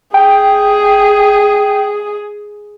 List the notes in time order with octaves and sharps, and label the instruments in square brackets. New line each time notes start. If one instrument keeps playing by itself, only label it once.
[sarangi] G#4 [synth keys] G5